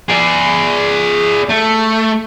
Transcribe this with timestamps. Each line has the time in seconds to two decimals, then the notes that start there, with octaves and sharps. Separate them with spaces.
0.09 G#4 D5
1.49 A3